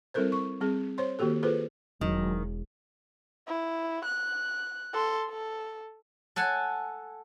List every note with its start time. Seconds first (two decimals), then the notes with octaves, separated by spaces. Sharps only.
0.14 G3 C4 E4 A4 A#4 C5
0.32 C#6
0.61 G3 C4 G#4
0.98 C5 C#5 C6
1.19 D#3 A#3 F#4 G4 A4
1.43 F4 G#4 A4 B4 C5
2.01 E1 D#3 F#3
3.47 E4
4.05 F#6
4.94 A4 C6
5.29 A4
6.36 A4 F#5 G#5 A5